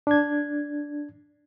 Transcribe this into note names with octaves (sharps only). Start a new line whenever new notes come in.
D4 G#6